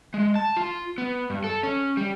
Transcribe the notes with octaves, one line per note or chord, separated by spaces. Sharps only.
G#3
A5
F4
B3
G2
A4
C#4
G3